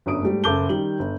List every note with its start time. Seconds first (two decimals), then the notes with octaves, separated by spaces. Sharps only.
0.06 G1 F#2 D4 D#6 D7
0.23 G#2 G3 A3
0.44 F#1 A4 A5 D6 G6 G7
0.69 D#3 G3 F#7
0.99 G1